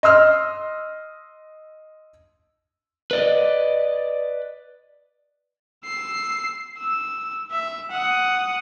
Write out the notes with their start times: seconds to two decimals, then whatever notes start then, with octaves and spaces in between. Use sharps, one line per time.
0.03 D#5 C6 E6 F6
3.11 B4 D5 D#5
5.85 E6 C7
6.78 E6
7.52 E5
7.91 F#5 D#6